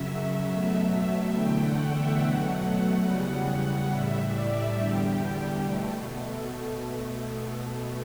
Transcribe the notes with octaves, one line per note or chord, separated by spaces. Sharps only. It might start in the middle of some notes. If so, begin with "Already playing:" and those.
Already playing: F#2 C#3 F#3 E5
B2 F#3 A3
E2 D3 A3 G5
F#5
E5
B2 F#3 A3 F#5
E2 C#3 G3
A2 G3 E5
D5
E2 D3 G3 G4
B2 A3
B2 A3